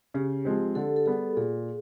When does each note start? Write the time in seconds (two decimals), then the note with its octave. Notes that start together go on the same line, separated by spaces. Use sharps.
0.14 C#3 G4
0.45 F3 G#3 C4
0.75 D3 A4
0.96 A4
1.06 G3 B3 G#4
1.37 A#2 G#4